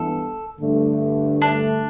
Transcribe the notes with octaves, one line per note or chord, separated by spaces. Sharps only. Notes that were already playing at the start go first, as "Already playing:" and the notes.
Already playing: G2 E3 B3 A4
G2 D3 A3
D4